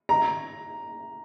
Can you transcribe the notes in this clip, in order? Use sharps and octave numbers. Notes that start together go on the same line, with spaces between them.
A#5